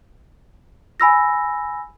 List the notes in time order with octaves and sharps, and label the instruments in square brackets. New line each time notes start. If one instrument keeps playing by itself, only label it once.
[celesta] G#5 B5 E6 A#6